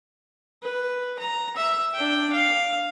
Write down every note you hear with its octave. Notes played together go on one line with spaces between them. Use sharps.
B4
A#5
E5
D4 G5
F5